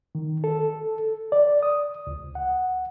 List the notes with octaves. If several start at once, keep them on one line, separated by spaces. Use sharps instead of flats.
D#3
A4
D5
D#6
C#2
F#5